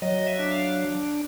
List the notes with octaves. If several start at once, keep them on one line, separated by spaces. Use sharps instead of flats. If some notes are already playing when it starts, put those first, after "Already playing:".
F#3 D#5
E5
D4
F5